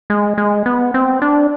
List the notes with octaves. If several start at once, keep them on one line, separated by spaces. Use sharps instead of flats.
G#3
G#3
B3
C4
D4